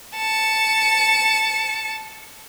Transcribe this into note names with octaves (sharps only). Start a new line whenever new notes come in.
A5 C#7